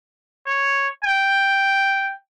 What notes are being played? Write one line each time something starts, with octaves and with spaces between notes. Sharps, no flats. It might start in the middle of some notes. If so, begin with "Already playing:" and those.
C#5
G5